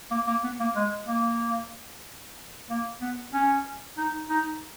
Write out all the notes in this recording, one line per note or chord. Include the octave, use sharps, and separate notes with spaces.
A#3
A#3
B3
A#3
G#3
A#3
A#3
B3
C#4
D#4
D#4